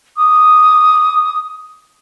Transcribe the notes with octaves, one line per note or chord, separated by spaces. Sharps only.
D6 D#6